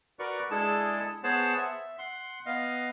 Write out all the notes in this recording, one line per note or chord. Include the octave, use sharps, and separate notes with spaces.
F#4 A#4 B4 D5 C#6
G#3 D4 E4 G#4 A4 A5
B3 G#4 C5 C#5 F#5 A5
E5
F#5 C6
B3 D#5 F5